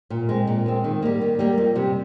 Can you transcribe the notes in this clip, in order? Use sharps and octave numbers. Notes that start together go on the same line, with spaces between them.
A#2
G#3 C4
A#2
G#3 C4
D#3
G3 A#3
D#3
G3 A#3
F2
C3 G3